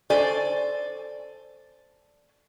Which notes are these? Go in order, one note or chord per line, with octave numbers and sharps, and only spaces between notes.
A4 C5 D5 G#5